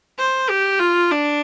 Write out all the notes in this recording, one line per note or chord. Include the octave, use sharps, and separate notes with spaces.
C5
G4
F4
D4